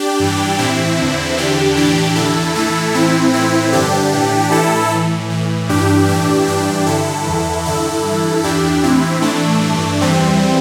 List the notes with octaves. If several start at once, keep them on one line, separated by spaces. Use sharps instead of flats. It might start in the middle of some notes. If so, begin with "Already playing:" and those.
Already playing: D4 G4
G2 E3
A2 E3 C4 E4
E2 D3
E2 D3 D4 G4
A2 E3 D4 G4
E2 D3 E4 A4
A2 E3 E4 A4
A2 E3 C4 E4
A2 E3 C4 E4
G2 D3 D4 G4
A2 E3
A2 E3 E4 A4
A2 E3
A2 E3
G2 E3 D4 G4
A2 E3 D4 G4
G2 E3 D4 G4
G2 D3 E4 A4
E2 E3
G2 D3 E4 A4
G2 E3
E2 E3 D4 G4
A2 E3 C4 E4
A2 E3 A3 D4
G2 E3
E2 E3 G3 C4